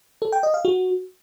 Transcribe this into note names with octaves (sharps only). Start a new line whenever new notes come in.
A4
G5
D#5
F5
F#4